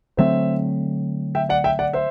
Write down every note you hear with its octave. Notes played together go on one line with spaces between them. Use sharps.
D3 F#3 A3 C4 C5 E5
E5 G5
D5 F#5
E5 G5
D5 F#5
C5 E5